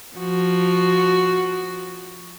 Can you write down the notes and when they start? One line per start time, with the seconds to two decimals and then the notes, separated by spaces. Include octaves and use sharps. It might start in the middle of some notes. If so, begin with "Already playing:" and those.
0.17 F3 F#4